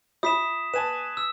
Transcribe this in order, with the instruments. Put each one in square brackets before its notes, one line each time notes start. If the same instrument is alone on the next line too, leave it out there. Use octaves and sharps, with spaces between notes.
[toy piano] F4 E5 [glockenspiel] D#6 B6 E7
[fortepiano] B4 G#5 A5 [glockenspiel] E7
[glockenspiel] E6